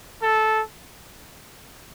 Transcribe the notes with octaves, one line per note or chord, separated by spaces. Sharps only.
A4